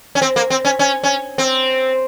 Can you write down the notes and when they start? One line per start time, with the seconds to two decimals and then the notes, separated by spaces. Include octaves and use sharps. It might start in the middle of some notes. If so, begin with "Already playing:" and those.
0.15 C#4
0.22 C4
0.36 A#3
0.50 C4
0.65 C#4
0.79 C#4
1.03 C#4
1.38 C4